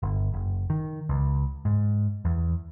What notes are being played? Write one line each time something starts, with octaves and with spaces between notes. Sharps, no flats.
G1
F#1
D#3
C#2
G#2
E2